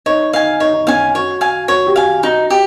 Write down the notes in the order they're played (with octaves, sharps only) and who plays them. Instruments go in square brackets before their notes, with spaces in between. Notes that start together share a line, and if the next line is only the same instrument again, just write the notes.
[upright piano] D#4 [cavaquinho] C#5
[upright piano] D#4 [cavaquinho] F5 G#5
[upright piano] D#4 [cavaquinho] C#5
[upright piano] D#4
[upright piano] C#4 [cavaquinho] F5 G#5
[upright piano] F#4 [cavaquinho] C#5
[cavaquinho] F5 G#5
[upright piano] F#4 [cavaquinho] C#5
[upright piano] G4
[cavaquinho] F5 G#5
[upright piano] F#4
[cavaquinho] D#4 [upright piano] F#4
[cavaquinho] G4